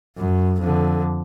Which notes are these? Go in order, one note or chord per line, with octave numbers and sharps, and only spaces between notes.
F#2
F2 D3